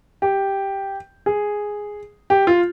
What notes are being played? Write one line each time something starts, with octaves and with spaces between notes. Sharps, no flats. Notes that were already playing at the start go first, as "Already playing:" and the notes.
G4
G#4
G4
F4